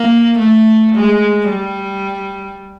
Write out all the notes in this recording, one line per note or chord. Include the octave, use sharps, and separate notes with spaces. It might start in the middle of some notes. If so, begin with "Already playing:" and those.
Already playing: A#3
A3
G#3
G3